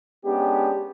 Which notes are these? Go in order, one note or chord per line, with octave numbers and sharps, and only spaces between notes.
G#3 B3 C#4 D4 G4